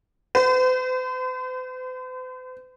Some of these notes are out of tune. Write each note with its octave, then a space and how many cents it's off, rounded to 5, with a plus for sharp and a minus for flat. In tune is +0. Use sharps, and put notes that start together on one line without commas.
C5 -45